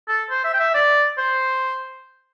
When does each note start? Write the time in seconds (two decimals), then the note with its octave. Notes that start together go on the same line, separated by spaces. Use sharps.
0.08 A4
0.30 C5
0.44 E5
0.54 G5
0.59 E5
0.74 D5
1.18 C5